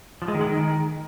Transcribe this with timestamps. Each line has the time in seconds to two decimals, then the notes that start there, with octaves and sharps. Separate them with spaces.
0.22 F3
0.28 G#3
0.34 D#3
0.41 G#3
0.47 D#3